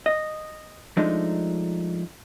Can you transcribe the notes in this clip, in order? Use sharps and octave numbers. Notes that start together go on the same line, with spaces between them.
D#5
F3 G#3 A3 D4 D#4